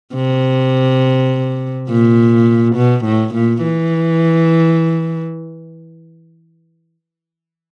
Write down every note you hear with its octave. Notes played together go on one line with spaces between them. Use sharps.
C3
A#2
B2
A2
A#2
E3